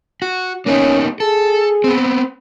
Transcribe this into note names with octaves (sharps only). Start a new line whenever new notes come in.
F#4
A#3 B3 C#4 D#4
G#4 A4
B3 C4